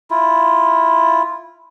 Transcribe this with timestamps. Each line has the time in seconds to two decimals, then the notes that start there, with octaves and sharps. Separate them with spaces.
0.11 E4 F4